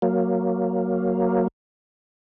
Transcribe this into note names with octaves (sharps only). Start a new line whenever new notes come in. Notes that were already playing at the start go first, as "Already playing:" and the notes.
F#3 A#3